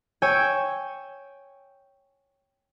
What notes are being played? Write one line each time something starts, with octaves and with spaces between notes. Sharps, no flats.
C#5 G5 G#5 E6